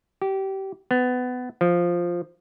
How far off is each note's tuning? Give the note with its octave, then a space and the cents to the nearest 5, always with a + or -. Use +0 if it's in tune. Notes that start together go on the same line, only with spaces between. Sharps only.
G4 -25
B3 +20
F3 +0